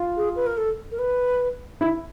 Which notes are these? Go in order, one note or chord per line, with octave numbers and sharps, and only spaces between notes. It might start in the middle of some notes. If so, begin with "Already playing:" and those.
Already playing: F4
G#4
B4
A#4
A4
A#4
B4
E4